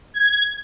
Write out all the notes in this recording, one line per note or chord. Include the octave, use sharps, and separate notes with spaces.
G#6